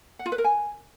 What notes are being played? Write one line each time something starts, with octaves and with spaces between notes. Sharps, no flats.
F#5
F4
B4
A#4
G#5